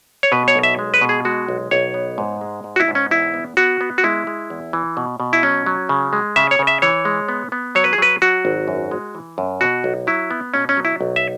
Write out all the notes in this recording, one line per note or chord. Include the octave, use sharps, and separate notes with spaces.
C#5
B2 B4
C#5
B1
E5
G#3
B4
B2
G#4
G#3 F#4
B1
B1 C#5
B3
G#2
G#3
G#2
F#4
E4
G#2
C#4
E2 E4
B3
B3 F#4
B3
F#4
G#3 E4
G#3
E2
E3
B2
B2
E4
F#3 C#4
F#3
C#3
G#3
C#3 E5
C#5
C#3
E5
E3 C#5
G#3
B3
B3
F#3 C#5
B4
G#4
F#3 B4
F#3 F#4
G#1
F#2
G#3
E3
F#2
B2 F#4
B1
F#3 E4
B3
B2 C#4
C#4
F#3
E4
B1
E5